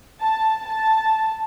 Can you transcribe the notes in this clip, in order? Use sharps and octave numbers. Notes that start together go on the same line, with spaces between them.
A5
A5